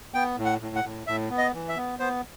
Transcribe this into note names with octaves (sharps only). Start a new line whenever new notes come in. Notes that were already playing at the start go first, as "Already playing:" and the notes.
B3 G5
A2
F#5
A2
F#5
A2
A2 E5
B3
D#5
E3
E5
B3
B3 C5